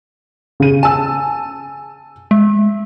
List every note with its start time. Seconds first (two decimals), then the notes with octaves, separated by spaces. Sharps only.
0.60 C#3 D#7
0.83 G#5 A5 E6
2.31 G#3